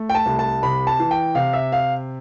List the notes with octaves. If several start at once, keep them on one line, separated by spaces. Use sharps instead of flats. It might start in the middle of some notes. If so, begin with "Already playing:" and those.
Already playing: A3
G5
A5
C2
A5
C3 B5
A5
E3
G5
C3 F5
E5
F5